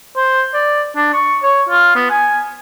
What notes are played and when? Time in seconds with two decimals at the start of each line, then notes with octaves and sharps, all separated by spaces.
0.16 C5
0.54 D5
0.96 D4
1.13 C#6
1.43 C#5
1.69 F4
1.95 B3
2.10 G#5